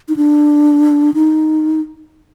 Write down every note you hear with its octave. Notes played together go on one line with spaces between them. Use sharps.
D#4
D4
D#4